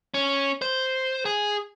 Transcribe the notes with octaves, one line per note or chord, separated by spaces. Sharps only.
C#4
C5
G#4